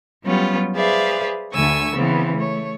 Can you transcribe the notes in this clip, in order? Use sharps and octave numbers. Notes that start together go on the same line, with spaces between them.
F#3 G3 B3 C#4 F4 G4
G#4 B4 C5 D5 E5 F5
D2 D3 A3 G#5 C#6 E6
C#3 E3 B3 C4
A3 C#5